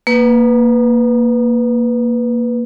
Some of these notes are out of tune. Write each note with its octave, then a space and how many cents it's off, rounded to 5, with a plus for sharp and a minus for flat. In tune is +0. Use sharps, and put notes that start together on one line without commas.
A#3 +0 B4 +0